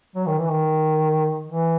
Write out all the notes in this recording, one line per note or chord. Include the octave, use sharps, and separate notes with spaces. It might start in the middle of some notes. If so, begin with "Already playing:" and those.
F#3
D#3
E3
D#3
E3